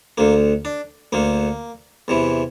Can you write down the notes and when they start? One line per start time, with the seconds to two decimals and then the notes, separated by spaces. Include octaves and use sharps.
0.18 D2 D3 A#3
0.65 D4
1.13 D2 D3 A#3
2.08 E2 C3 E3